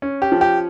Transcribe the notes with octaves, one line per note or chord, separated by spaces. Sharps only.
C#4
G4
F3
G4